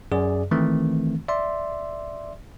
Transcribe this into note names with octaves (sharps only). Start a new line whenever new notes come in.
F#2 G#4 D5
D#3 E3 A3 C4
D5 E5 C6